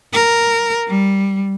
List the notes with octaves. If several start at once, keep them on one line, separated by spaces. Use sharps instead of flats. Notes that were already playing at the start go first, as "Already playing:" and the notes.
A#4
G3